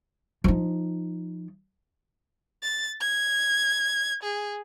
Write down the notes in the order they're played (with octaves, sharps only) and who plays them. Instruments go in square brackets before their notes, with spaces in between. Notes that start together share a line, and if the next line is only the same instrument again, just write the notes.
[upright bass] F3 D#4
[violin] A6
G#6
G#4